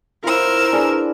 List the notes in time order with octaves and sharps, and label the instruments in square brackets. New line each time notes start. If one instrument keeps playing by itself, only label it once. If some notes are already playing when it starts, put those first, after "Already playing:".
[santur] E4 F4 [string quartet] A#4 C5 E6
[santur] D4 G#4 B4